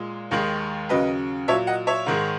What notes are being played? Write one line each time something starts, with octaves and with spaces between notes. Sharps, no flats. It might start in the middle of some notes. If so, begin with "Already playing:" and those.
Already playing: A#2 G#3
D#2 D#3 G#3
D#2 C#3 F#3 B4 D#5
A#2 F#3 C#5 E5
D#5 F#5
C#5 E5
G#2 D#3 G#3